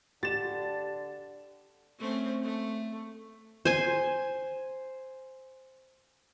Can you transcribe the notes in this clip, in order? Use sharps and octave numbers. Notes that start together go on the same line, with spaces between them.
D3 G4 A6 E7
A3 C4 C#4
A3
C5 G#5